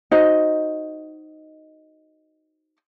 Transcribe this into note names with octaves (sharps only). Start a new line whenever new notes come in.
D#4 F#4 C5 D#5